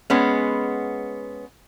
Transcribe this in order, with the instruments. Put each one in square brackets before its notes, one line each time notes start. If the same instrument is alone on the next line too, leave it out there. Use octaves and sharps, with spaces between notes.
[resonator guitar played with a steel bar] G#3 B3 C#4